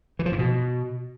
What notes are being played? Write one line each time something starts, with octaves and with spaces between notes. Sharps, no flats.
E3
F3
G#2
B2